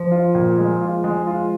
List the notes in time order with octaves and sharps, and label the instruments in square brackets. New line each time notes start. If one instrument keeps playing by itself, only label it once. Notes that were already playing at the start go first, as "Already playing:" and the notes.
Already playing: [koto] F3
[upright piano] F4
A#2
G#3
F4
G#3
F4